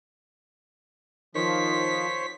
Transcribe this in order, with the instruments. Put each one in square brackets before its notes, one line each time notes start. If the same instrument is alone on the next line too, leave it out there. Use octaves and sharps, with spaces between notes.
[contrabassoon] D#3 [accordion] F3 [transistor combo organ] C5 C#5 [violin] B6